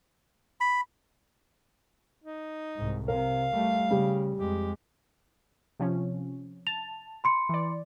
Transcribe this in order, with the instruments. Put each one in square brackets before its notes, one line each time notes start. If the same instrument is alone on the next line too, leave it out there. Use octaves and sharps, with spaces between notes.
[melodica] B5
[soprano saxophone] D#4
[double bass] C2 G#2
[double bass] C3 [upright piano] A#4 [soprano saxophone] F5
[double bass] G3 A3
[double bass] C#3 [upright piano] G3
[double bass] F2 G#3 [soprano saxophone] G4
[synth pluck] C3 F3 C#4
[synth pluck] A5 [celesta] F7
[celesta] B5 C6 C#7
[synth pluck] E3 D5